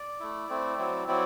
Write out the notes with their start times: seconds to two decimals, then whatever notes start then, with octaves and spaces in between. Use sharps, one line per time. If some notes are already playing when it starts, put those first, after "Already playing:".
Already playing: D5
0.20 A3 E4
0.49 A3 C4 E4
0.78 F#3 C4 E4
1.07 F#3 C4 E4 D5